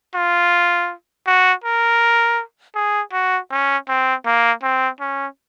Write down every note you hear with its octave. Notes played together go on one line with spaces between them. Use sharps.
F4
F#4
A#4
G#4
F#4
C#4
C4
A#3
C4
C#4